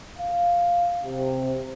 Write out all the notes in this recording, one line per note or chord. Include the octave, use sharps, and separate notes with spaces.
F5
C3